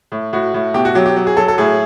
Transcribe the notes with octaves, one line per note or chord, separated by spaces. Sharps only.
A2
A2 F#4
A2
B2 G4
F#4
F#3 G4
G4
F#3
G#4
F#3 A4
A4
A2 G#4